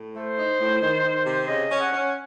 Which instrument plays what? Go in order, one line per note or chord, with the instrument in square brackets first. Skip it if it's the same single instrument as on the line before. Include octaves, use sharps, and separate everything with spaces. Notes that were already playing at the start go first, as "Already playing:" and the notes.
Already playing: [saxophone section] A2
[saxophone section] A3 [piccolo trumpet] C5
[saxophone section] D#4
A2
D#3
D#3
C3
[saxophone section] C#3 [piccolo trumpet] D#5
[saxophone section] C#4
[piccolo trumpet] F#5
[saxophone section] C#4